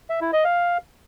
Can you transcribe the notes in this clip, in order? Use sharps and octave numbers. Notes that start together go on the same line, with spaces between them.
E5
E4
D#5
F5